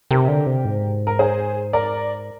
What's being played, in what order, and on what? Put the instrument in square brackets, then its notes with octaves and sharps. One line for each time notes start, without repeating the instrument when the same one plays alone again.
[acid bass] C3 [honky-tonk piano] G4 A#4
[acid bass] D3
C3
G#2
[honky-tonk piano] A#4
G#4 C5
A#4 D5